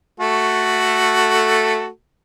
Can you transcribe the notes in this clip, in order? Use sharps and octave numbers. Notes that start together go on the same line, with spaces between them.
A3 F#4 A4